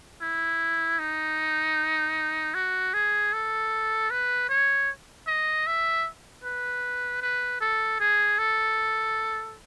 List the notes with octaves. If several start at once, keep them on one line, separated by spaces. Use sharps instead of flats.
E4
D#4
F#4
G#4
A4
B4
C#5
D#5
E5
B4
B4
A4
G#4
A4